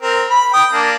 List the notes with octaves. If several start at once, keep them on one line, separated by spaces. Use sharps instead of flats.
C4 A#4
B5
G5 D#6
A#3 D4